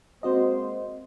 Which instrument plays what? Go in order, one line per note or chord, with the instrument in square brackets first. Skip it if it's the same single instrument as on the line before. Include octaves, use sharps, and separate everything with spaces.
[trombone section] G#3 A#3 C5 [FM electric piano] C4 F#4 D#5